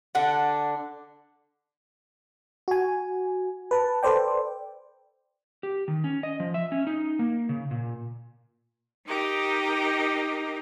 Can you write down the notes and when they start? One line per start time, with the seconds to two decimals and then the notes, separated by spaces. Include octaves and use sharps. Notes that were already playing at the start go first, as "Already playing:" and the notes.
0.15 D3 D4 F#5
2.68 F#4 G#5
3.71 B4 A5
4.03 A4 B4 C5 D5 G5
5.63 G4
5.88 D#3
6.04 C#4
6.23 D#5
6.40 F3
6.54 E5
6.72 C#4
6.87 D#4
7.19 A#3
7.49 C#3
7.71 A#2
9.06 D#4 G4 A#4 D#5